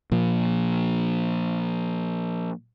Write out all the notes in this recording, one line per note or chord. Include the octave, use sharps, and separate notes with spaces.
A#2 F3